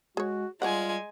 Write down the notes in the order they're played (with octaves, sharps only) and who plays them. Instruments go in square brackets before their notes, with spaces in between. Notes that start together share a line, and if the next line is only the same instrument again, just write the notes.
[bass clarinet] G#3 [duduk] F#4 [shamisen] G#4 C#5
[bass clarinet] G3 [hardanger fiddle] G#3 G#5 [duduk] F4 [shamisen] C#5 D5 F#5